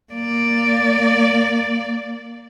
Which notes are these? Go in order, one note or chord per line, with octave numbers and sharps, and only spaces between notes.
A#3 D5